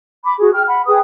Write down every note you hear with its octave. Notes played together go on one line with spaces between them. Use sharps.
B5 D6
F#4 G#4
G5 F6
F#5 B5
G#4 B4 G5 D#6